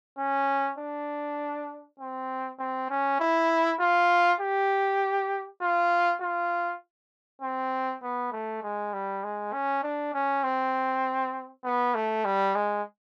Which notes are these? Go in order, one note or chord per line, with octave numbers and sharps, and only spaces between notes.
C#4
D4
C4
C4
C#4
E4
F4
G4
F4
F4
C4
B3
A3
G#3
G3
G#3
C#4
D4
C#4
C4
B3
A3
G3
G#3